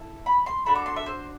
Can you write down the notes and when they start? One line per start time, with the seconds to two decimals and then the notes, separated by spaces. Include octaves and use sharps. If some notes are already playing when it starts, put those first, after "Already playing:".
Already playing: E4 A4
0.26 B5
0.46 C6
0.66 D4 F#4 A4 B5
0.75 D6
0.86 C6
0.96 E5
1.06 C5